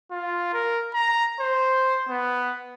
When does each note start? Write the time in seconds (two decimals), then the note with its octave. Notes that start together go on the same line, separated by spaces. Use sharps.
0.11 F4
0.54 A#4
0.94 A#5
1.40 C5
2.10 B3